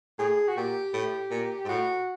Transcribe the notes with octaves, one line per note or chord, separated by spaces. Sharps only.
A2 G#4
F#4
A#2 G4
A2
A#2
G#2
A2 F#4